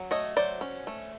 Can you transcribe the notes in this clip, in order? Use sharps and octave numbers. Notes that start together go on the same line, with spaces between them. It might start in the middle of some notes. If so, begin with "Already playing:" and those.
Already playing: F#3
A3 C#5 D#5
F#3 C5 D5
C#4
A3